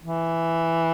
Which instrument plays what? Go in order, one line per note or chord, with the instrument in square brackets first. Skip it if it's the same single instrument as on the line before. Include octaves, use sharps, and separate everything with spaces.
[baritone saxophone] E3